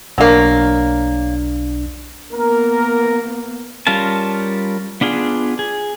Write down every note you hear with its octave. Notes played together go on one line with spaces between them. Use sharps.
B1 F#3 A#3 D4
A#3 B3 A#4
G3 C#4 F4 A#4 A5
B3 D4 F4 G#4
G#4